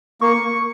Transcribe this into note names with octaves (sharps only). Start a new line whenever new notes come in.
A#3 C#6